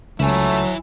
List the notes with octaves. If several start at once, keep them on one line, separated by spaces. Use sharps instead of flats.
C#2 F#3 A3 E4 G#5